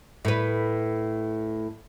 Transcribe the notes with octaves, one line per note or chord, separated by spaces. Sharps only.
A2 B4